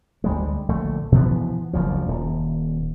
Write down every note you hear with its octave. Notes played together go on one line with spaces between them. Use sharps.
D2 G3 G#3
A#1 D3 A3
B2 E3 F3 B3
F#1 D2 F3
D#1